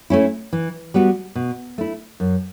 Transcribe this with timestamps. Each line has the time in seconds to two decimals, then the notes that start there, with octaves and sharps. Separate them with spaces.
0.10 A3 C#4 E4
0.53 E3
0.94 G3 B3 F#4
1.35 B2
1.78 A3 E4
2.20 F#2